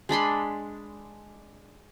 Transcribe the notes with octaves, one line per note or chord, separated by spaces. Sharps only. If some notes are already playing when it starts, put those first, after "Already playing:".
G#3 D4 B5 C6